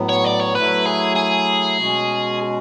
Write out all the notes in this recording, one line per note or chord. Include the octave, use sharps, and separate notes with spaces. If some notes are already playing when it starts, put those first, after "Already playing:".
Already playing: A2 F#3 B3
C#5
D5
C#5
F#3 A3 E4 B4
G#4
G#4
B2 G#3 C#4 F#4